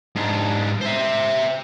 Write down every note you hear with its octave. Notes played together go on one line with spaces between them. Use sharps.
G#2 D4
C5 E5